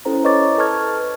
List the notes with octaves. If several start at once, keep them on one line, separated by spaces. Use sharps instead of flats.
C#4 E4 A4 C5 A#5
B4 C#5 D#5 C#6 D6 A6
A4 B4 A5 C#6 F6 G#6